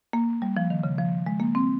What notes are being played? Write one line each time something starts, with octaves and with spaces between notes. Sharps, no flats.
A#3
G3
F3
D#3
C#3
F3
G#3
A#3
C4